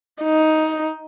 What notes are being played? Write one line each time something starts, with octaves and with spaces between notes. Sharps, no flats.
D#4